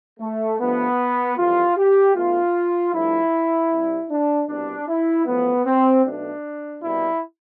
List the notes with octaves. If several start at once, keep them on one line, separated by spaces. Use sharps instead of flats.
A3
G2 F3 A3 B3
F2 E3 G3 F4
G4
B1 B2 A3 F4
G2 F3 A3 E4
C2 C3 G3
D4
C2 B2 G3 D4
E4
A1 A2 F3 B3
C4
B1 B2 A3 D4
C2 B2 G3 E4